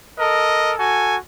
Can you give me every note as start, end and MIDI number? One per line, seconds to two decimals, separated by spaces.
0.18 0.73 69
0.18 0.73 70
0.18 0.73 75
0.78 1.16 66
0.78 1.16 69
0.78 1.16 80